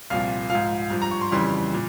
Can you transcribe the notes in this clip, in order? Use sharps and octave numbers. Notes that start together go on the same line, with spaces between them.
C2 A#2 F3 F5
G#2 F3 F5
G2 F3
A#5
C#6
C6
F2 C#3 E3 G3 C6
A#2